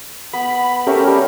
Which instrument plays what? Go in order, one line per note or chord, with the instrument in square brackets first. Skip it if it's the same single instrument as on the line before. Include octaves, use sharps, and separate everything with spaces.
[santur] B3 [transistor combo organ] B5
[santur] A3 C#5 A5 [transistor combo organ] C#4 G4 A#4
[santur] G3 C#5